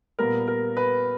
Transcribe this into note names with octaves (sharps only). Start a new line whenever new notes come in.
A#2 G3 B3 A#4
A#4
B4